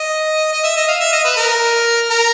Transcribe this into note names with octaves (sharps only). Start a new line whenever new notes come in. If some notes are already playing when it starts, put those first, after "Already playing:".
Already playing: D#5
D#5
E5
D#5
F5
E5
D#5
B4
A#4
A#4